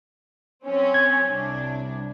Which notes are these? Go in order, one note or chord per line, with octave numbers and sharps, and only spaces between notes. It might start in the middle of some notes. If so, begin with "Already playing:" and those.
F#3 C4 C#4
G#6
C2 D4